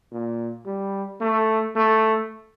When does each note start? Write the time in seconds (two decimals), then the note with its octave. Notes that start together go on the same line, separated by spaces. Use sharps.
0.12 A#2
0.66 G3
1.21 A3
1.76 A3